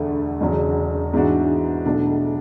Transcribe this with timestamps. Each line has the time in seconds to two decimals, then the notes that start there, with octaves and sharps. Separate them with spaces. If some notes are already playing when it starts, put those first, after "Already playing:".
Already playing: E1 D2 D3 A3
0.41 E1 E2 C#3 F#3
1.13 G#2 E3 B3 D4 F#4
1.85 B1 B2 A3 D4